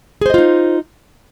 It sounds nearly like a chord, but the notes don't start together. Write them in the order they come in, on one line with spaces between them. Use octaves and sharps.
G#4 C5 D#5 F4 D#4